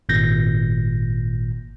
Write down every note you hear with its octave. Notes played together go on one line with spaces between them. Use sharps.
G#1 A#2 G6 A#6